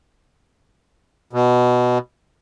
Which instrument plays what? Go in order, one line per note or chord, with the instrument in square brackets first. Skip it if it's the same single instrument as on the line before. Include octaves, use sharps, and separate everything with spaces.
[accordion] B2